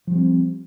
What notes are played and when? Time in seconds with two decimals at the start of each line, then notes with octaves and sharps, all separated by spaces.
0.07 F3
0.11 G3
0.15 C4